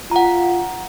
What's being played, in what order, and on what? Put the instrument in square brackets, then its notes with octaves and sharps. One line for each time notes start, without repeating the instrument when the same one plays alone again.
[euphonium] F4 [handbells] F#5 A#5